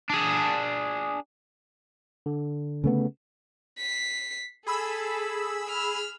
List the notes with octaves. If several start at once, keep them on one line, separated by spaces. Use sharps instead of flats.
D4 G#4
D3
C#3 A3 B3
B6 C7
G#4 A4 B5 E6
F6